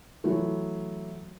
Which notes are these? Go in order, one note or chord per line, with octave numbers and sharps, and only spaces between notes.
E3 F#3 A3